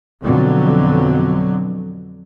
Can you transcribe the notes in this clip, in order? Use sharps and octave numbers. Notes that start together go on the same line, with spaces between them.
F2 B2 D3 F#3